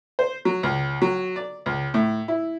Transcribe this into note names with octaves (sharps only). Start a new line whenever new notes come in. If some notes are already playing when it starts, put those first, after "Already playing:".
C5
F#3
C#2
F#3
D5
C#2
A2
E4